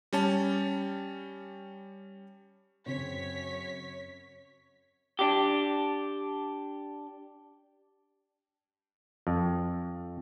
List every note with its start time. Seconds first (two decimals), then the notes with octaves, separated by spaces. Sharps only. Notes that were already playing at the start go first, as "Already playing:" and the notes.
0.13 G3 C#4 A5
2.86 F#2 C#3 C4 C#5 B6
5.19 D4 G4
9.27 F2